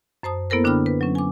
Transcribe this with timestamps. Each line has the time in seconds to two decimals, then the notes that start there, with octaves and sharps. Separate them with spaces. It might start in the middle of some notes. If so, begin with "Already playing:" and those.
0.23 F#2 C5 A5 D#6
0.50 A#3 B3 E4 A4 A#4 C5
0.64 D3 D4 E4 G5 B5 F6
0.86 B4
1.01 F#3 C#4
1.15 G#5 D6